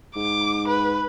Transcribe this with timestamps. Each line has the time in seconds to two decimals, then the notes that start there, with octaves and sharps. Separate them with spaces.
0.16 G#2 D6
0.68 B4